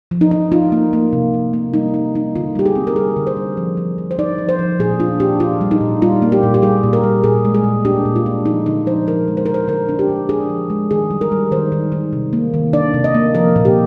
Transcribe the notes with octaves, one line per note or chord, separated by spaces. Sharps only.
F3
D#4
D#4
D#4 F4
A#3
A#3
C3
C3
A#3
G3 D#4
D#4
D#4
D3 F4
G3 G4
G#4
C4
A#4
G3 G#4
D3
C5
G3
F3
F3
F3
C5
D#4 D5
F3
C5
F3
A#2 G#4
D4 F4
D4 G4
D4 F4
G3
D#4
A#2
G3 F4
A#3
G4
A#2
G4
G3 G#4
A#2
A#4
G3
A#2 G#4
G#3
G#4
A#2
D4 G4
A#2
F4
D4
F3 D#4
D3 D#4
F3 C5
F3 A#4
G#3
C5
D3 A#4
C5
D3 A#4
D4
G4
D3
D4 G#4
F3
G#3
D#3 G#4
G3
A#4
G3
D#3 C5
D#3
D#3
C3
A#3
D#3
D4 D5
C3
D#5
A#3
F3 A#4
A#2
G4